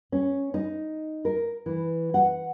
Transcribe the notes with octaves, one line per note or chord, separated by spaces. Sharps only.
C#4
D#4
A#4
E3
F#5